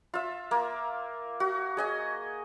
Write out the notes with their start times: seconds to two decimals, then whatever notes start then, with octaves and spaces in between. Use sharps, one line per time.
0.14 F4 E5
0.51 A#3
1.40 F#4
1.77 G#4 D#5 G#5